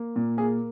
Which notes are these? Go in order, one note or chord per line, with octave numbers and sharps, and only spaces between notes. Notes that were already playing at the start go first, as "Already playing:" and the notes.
Already playing: A#3
A#2
A#3 G#4